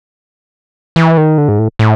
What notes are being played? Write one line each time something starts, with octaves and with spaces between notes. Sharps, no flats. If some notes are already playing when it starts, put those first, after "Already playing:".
E3
D#3
D3
G#2
A2
A2